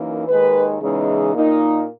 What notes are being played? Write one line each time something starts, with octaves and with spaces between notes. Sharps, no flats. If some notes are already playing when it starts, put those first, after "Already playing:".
Already playing: F#2 E3 A#3 D#4
D#2 D#3 G#3 B4
E2 C#3 E3 G#3 D#4
A#2 A#3 D#4